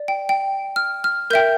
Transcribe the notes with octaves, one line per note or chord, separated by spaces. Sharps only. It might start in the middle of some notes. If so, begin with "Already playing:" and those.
Already playing: D5
G5
G5
F6
F6
A#4 E5 G5 G6